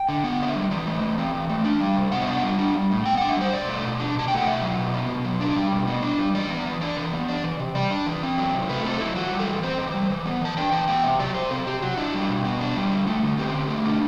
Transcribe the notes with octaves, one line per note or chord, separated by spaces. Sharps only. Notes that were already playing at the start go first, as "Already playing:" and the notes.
Already playing: G5
D3
B3
D3 D5
E5
G3
E3 D5
A3
E3
C4
E3
A3
D4
G3
C3
B3 F#5
E5
D4 F#5
G3
D4
G3
A2
B3 G5
D4 F#5
E5
G3 C5
B2 D5
A3
B2
D4
B2 A5
A3 G5
F#5
B2 E5
F#3
B2
B3
B2
F#3
D4 D5
G3
B2
B3
D4
G3
E3 D5
B3
E3
D4 D5
E3
B3
D4
E3
C3
G3 D5
D4
E3
C4
F#3
C3
A3 B4
C4 A4
F#3 E4
E3 F#4
G3
A4
E3
C4 C5
E3
G3
E3
B3
E3 A5
D4 G5
E3 A5
B3 G5
C3 E5
F#3 D5
C3 C5
C4 A4
C3 G4
F#3 F#4
D4 E4
G3
F#4
B2
B3
D4
G3
D3
A3
D3
C4 G4
D3
A3
D4